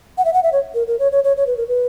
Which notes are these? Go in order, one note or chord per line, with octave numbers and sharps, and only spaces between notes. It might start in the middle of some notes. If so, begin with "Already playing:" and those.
F#5
E5
F#5
E5
C#5
A#4
A#4
C#5
C#5
C#5
C#5
B4
A#4
B4